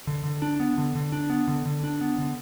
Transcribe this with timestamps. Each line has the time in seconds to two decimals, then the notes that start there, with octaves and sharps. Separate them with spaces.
0.07 D3
0.24 D3
0.42 D4
0.60 B3
0.78 D3
0.95 D3
1.12 D4
1.30 B3
1.48 D3
1.66 D3
1.83 D4
2.01 B3
2.18 D3